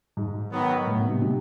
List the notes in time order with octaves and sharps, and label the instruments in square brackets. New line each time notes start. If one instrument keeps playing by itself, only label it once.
[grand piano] G#2
[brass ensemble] D#3 F#3 B3
[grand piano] A2
B2
C3
C3